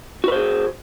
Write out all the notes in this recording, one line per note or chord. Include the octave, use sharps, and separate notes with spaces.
F#4 G#4 B4 C5